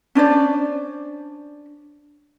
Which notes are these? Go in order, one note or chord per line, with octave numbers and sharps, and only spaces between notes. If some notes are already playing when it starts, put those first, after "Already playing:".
C#4 D4 C5 D5